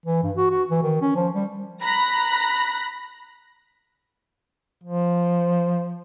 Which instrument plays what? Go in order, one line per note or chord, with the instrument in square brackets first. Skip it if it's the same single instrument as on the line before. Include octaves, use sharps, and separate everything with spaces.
[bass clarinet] E3
G2
F#4
F#4
E3
D#3
C#4
F3
G3
[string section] A#5 B5 F#6 A#6 B6
[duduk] F3